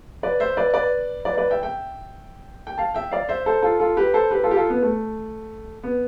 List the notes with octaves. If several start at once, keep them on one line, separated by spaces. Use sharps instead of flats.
B4 D5
C5 E5
B4 D5
B4 D5
B4 D5
B4 D5
E5 G5
E5 G5
G5
F5 A5
E5 G5
D5 F5
C5 E5
A4 C5
F4 A4
F4 A4
G4 B4
A4 C5
G4 B4
F4 A4
G4
F4 A4
B3
A3
B3